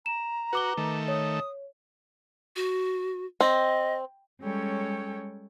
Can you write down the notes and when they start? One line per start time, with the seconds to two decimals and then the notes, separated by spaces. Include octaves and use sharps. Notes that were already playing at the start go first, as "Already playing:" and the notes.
0.06 A#5 E7
0.53 F#4 B4 D6 G7
0.77 D#3 A3
1.08 C#5 D#6
2.56 F#4
3.41 C4 D#5
4.41 G3 G#3 C#4 A4 C#5 G5